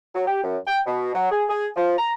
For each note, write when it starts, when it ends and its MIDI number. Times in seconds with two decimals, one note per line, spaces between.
0.15 0.26 54
0.27 0.43 67
0.44 0.58 42
0.67 0.80 79
0.87 1.10 47
1.15 1.30 54
1.32 1.44 68
1.50 1.67 68
1.76 1.96 53
1.98 2.13 82